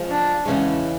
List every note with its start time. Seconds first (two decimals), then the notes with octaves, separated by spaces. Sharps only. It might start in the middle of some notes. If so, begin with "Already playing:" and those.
Already playing: F3 G#3 C4
0.10 D4
0.46 E2 C#3 E3 G#3 C#4